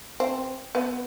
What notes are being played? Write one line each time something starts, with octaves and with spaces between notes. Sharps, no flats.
C4
B3